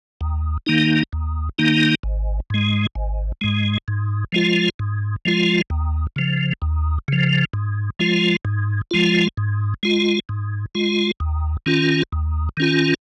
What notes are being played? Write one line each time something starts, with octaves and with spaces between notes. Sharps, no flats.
D#2
D#3 A#3 D#4
D#2
D#3 A#3 D#4
G#1
G#2 G#3
G#1
G#2 G#3
G#2
F3 G#3 F4
G#2
F3 G#3 F4
D#2
C#3 F3
D#2
C#3 F3
G#2
F3 G#3 F4
G#2
F3 G#3 F4
G#2
G#3 F4
G#2
G#3 F4
D#2
D#3 C#4 F4
D#2
D#3 C#4 F4